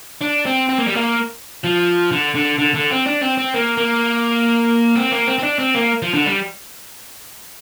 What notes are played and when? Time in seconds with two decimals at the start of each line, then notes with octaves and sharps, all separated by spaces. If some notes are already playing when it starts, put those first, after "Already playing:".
0.22 D4
0.46 C4
0.69 C4
0.78 A#3
0.87 G3
0.96 A#3
1.64 F3
2.11 D3
2.35 D3
2.59 D3
2.74 D3
2.90 C4
3.06 D4
3.22 C4
3.38 C4
3.54 A#3
3.77 A#3
4.95 C4
5.11 A#3
5.27 C4
5.39 C4
5.43 D4
5.59 C4
5.75 A#3
6.02 F3
6.14 D3
6.26 G3